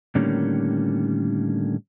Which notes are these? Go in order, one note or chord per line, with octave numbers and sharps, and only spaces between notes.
A2 D3 D#3 G3 A#3 C#4